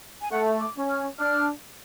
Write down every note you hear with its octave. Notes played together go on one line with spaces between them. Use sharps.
G#5
A3 F#5
D6
C#4
F6
D4 F6